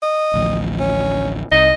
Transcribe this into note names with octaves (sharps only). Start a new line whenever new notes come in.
D#5
A1 D2 F3
C#4
C2 D#4 D#5